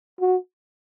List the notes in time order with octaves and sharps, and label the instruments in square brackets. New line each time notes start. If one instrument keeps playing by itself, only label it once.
[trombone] F#4